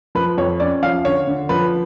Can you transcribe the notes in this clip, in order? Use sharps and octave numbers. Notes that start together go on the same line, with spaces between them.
F3 B4
F2 C#5
C#4 D5
F3 F5
D3 C#5
D3
F3 B4